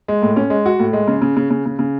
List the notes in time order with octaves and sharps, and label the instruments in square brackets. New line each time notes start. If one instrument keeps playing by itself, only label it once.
[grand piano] G#3
A2
C#4
G#3
F#4
A2
G#3
C#3
C#3
C#3
C#3
C#3
C#3